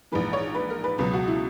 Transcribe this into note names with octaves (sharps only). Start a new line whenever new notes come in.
A#1 G#2 E3 B4
C#5
B4
A#4
B4
C#2 B2 F#3 B4
F#4
E4